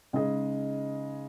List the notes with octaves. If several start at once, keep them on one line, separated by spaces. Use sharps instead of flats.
C#3 G#3 D#4 G#4 D#5